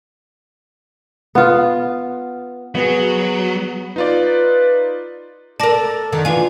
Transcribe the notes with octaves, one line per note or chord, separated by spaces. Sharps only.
B3 F4
F#3 B3 F#4 G#4
D#4 F4 B4 D5
A4 A#4 D5 A5 A#6
F#2 D3 D#3
E3 D4 F4 B4 G#5